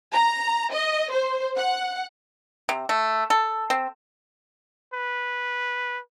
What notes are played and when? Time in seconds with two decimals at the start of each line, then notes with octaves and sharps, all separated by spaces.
0.12 A#5
0.72 D#5
1.12 C5
1.57 F#5
2.69 C3
2.89 A3
3.30 A4
3.70 C4
4.94 B4